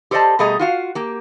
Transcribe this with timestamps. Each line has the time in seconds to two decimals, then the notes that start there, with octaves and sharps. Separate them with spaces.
0.11 G4 A4 C5 D5 D#5 A5
0.39 B2 G3 A3 G#4 D#5 A#5
0.59 F4 F#4 F5
0.95 A#3 G4